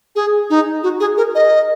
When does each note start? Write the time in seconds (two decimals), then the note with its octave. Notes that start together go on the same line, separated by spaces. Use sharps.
0.16 G#4
0.50 D#4
0.83 F#4
1.00 G#4
1.17 A#4
1.35 D#5